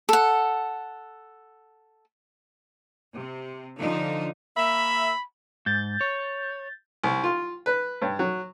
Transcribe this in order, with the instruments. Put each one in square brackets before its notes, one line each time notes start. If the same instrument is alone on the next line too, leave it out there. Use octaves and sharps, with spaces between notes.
[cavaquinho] A4 F#5
[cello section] C3
D3 F3 D#4
[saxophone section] A#3 E5 [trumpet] B5
[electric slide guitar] G#2 [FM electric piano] G6 A6
[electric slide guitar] C#5
[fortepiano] C2
F4
B4
G2
F#3